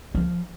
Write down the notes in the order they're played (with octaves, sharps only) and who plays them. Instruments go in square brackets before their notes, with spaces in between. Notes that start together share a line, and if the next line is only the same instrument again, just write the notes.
[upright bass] F3